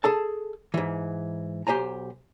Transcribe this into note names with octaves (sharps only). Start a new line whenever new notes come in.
G#4 A4 A5
G#2 E3
B1 G4 C5 G#5 A#5